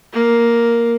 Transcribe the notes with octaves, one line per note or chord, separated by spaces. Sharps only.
A#3